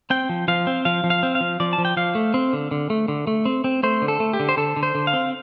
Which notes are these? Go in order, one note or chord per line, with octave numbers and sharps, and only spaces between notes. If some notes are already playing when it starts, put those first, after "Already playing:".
C4 G5
F3
F3 F5
C4
F3 F5
F3
F5
C4
F5
F3
F3 D5
A5
F3
G5
F3 F5
A3
C4
D3
D3
A3
D3
A3
C4
C4
A3 C5
D3
A4
A3
G4
D3
C5
D3 A4
D3
C5
D3
F5
C4